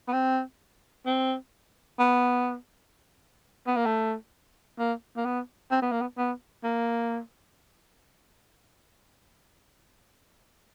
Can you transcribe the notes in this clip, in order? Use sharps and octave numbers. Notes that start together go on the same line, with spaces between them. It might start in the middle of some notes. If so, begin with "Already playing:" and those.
B3
C4
C4
B3
B3
A#3
A3
A#3
A#3
B3
C4
B3
A#3
B3
B3
A#3